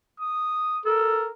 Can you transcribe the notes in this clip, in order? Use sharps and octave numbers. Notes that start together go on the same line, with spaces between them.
D#6
A4 A#4